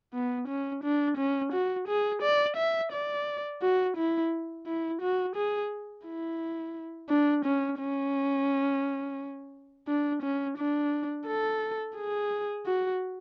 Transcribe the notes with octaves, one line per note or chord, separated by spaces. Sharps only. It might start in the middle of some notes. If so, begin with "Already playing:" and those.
B3
C#4
D4
C#4
F#4
G#4
D5
E5
D5
F#4
E4
E4
F#4
G#4
E4
D4
C#4
C#4
D4
C#4
D4
A4
G#4
F#4